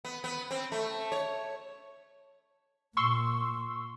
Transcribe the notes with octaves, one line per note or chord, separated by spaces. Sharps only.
B3
B3
C4
A3
C#5
A#2 C6 C#6 E6